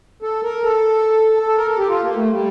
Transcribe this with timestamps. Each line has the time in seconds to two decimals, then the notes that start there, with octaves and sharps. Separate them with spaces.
0.22 A4
0.43 A#4
0.64 A4
1.47 A4
1.57 A#4
1.68 A4
1.78 G4
1.89 F4
2.02 A#3
2.16 A3
2.31 G3